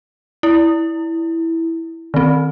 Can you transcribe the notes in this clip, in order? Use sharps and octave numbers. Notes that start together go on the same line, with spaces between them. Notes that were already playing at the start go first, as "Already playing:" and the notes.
E4
D#3 C4